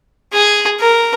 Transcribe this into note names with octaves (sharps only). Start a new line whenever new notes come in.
G#4
A#4